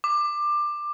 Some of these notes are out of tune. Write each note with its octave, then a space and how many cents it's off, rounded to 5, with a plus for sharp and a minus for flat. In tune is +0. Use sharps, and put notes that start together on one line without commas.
D6 +20